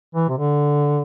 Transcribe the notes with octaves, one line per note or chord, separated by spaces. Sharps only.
E3
C3
D3